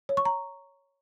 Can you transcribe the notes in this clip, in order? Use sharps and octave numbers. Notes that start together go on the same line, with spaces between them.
C#5
C#6
A#5